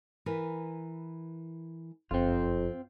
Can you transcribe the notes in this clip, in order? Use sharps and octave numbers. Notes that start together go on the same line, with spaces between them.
E3 A#4 B4
F#1 F2 C4 F4